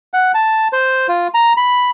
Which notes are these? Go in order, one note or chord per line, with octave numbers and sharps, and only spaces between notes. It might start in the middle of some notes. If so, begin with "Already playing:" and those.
F#5
A5
C5
F4
A#5
B5